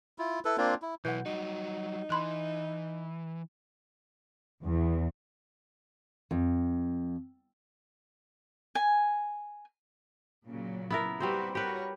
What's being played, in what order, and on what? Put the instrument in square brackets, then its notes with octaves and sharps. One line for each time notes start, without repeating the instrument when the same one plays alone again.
[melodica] E4 F4
E4 A4 B4
A#3 C4 D4 F4
E4
[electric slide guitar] B2 F#3 [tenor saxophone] E3 [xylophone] F#5 G6
[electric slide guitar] F#3 G3 F#4 [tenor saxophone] D#4
[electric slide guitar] E3 [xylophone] B5 C6 F#6
[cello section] E2
[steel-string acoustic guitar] F2
[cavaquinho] G#5
[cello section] A#2 C#3 F#3
[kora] B3 E4 A#4
[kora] G3 C4 C5 [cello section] F#4 G4 B4
[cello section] F#4 A#4 C#5 [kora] G4 B4